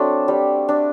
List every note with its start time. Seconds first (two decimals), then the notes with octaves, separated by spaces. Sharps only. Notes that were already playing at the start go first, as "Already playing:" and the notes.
Already playing: F#3 A3 C4 D4
0.28 G3
0.69 D4